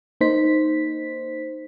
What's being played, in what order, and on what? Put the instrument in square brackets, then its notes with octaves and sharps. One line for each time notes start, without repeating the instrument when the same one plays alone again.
[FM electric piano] A#3 D#4 C5 B6